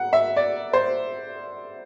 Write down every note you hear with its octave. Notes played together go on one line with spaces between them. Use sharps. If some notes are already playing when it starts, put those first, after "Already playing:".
Already playing: F#5
E5
D5
C5